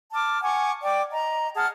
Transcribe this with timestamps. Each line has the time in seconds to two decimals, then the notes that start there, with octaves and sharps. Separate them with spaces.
0.12 A5 D6 F6
0.42 F#5 G#5 C#6 D6
0.82 D5 G5 D6
1.13 D#5 A#5
1.56 G#4 F#5 A5 F6